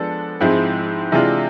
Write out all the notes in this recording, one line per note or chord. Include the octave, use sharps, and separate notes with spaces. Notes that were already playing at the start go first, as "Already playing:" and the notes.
Already playing: F3 G#3 B3 D4 A4
G#2 F3 G#3 C4 E4
C3 E3 G#3 D4 F4